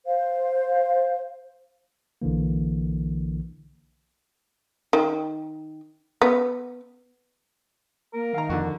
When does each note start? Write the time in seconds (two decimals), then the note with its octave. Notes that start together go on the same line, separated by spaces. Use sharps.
0.06 C5 F5
2.22 B1 D3 E3 A#3
4.93 D#3
6.22 B3
8.14 A#3 A#4
8.34 D#3 F5 A#5
8.49 F2 D3 F#4